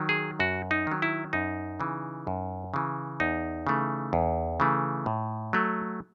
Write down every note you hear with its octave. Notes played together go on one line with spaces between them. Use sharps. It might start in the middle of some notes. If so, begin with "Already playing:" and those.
Already playing: D#3 F#3
G#4
F#2 F#4
D#4
D#3 F#3
E4
F#2 D#4
C#3 E3
F#2
C#3 E3
E2 D#4
C#3 E3 A3
E2
C#3 E3 A3
A2
F#3 A3